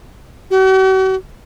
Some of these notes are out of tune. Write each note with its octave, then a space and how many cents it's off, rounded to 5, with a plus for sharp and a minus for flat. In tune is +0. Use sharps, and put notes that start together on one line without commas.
F#4 +45